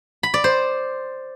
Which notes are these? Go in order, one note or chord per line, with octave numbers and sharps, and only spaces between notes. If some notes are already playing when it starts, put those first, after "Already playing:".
B5
D5
C5